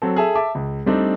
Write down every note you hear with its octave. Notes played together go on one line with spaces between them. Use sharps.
F#3 C4 A4
G#4 A4 E5 A5 E6
E5 A5 D6
C#2
G3 A3 C4 D4 D#4